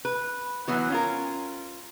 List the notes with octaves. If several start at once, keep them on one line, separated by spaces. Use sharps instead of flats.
B4
E3 F#3 B3 F#4
C#4 F4 A#4